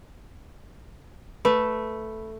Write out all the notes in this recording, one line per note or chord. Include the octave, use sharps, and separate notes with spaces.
A3 B4